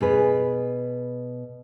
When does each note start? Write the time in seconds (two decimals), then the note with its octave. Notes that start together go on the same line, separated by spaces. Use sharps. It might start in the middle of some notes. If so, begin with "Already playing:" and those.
0.01 B2 G#4 B4